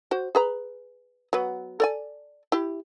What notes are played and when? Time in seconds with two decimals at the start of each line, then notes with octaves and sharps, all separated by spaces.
0.11 F#4 C5
0.35 G#4 B4 A#5
1.33 F#3 B3
1.80 A4 D5 G#5
2.52 E4 G4